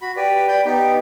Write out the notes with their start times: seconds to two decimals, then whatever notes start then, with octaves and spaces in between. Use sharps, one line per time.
0.02 F#4 B5
0.16 G4 B4 D5
0.48 D5 G5 B5 G6
0.65 B3 D#4 G4